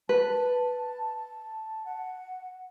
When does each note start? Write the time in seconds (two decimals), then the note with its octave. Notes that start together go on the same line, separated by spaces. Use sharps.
0.09 B4 A5
1.86 F#5